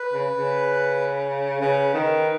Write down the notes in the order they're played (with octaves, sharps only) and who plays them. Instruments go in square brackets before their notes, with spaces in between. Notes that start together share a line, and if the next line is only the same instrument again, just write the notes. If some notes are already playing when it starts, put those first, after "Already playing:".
Already playing: [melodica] B4
[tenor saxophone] C#3
C#3
[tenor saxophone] C#3 [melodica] B4
[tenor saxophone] D#3